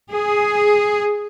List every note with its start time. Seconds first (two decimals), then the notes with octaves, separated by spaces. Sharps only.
0.12 G#4